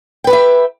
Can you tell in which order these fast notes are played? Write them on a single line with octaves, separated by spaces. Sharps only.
G5 B4 G4 E5